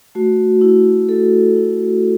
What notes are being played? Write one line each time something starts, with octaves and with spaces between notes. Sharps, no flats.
A3 F#4
E4
E4 A4
E4